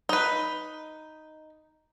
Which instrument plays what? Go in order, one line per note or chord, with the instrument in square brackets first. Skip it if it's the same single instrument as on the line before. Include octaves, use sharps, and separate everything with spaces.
[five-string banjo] D#4 B4